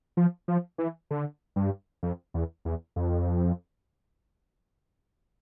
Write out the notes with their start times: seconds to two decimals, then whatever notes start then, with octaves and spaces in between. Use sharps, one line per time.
0.17 F3
0.48 F3
0.78 E3
1.11 D3
1.56 G2
2.03 F2
2.34 E2
2.65 E2
2.96 F2